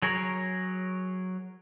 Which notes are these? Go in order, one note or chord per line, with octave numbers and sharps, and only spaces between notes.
F#3 G#4 A#4 C#5